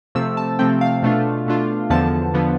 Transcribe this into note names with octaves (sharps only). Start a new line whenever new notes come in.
C3 F3 A3 C4 E6
A5
C3 F3 A3 C4 G5
F5
B2 A3 D4 F4
B2 A3 D4 F4
E2 D3 F3 B3 A5
D3 F3 B3